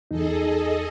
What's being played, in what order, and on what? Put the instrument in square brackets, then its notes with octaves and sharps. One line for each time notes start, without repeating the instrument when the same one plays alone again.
[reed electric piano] E2 D#4 [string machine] G#4 A4 D#5